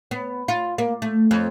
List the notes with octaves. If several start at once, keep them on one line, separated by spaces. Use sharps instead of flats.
B3
F4
A#3
A3
F2